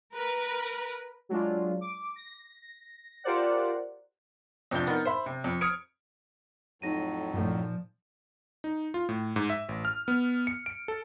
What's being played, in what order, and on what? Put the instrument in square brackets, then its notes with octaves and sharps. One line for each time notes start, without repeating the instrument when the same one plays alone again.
[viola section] A#4 B4
[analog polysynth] F#3 G#3 D4 F4
D6
A#6
F4 G4 A#4 C5 D5 F#5
[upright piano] F2 C3 F3 D4 G6 G7
B3 D#4 A#4
C5 E5 B5
C3
F2
D#6 F6 G#6 C#7 D7
[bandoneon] F2 A2 F#3 [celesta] D#4 A#6 D#7
[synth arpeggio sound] G2 A3 [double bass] A#2 F3
[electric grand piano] D#4
F4
A2
G#2
E5
A1
F6
B3
C#7
D7
A4